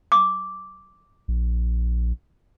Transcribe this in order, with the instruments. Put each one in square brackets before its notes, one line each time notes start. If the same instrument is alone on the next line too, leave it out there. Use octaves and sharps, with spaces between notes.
[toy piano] D6
[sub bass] A#1